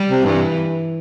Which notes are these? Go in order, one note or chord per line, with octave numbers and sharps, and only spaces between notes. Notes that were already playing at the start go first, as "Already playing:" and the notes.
Already playing: G3
C3
G2 E3